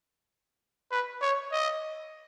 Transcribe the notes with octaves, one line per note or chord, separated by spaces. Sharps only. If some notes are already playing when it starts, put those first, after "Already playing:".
B4
C#5
D#5